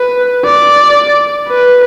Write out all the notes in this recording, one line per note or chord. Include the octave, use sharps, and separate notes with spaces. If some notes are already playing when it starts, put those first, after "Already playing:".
Already playing: B4
D5
B4